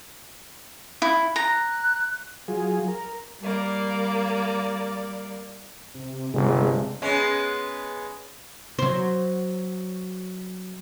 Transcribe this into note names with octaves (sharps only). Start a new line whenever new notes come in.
E4
A#5 F#6
F#3 F4 G#4
A#4
G3 A#3 D5
C3
G1 C3 G#3
G#3 B3 C#4
F#3 C5